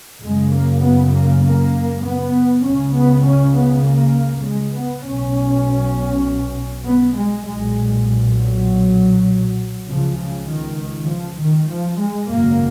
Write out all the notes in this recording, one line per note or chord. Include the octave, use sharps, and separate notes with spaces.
F#1 F#2 C#3 G#3
A#3
B3
A#3
A#3
B3
C#2 C#3 C#4
B3
C#4
B3
A#3
G#3
B3
B1 B2 C#4
B3
G#3
B1 A#2 G#3
F#3
C#2 C#3 F3
C#3
D#3
F3
D#3
F3
G#3
G#1 F#2 C#3 A#3